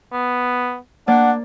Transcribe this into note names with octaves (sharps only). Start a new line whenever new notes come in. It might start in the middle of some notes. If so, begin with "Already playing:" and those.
B3
A#3 D4 D5 F#5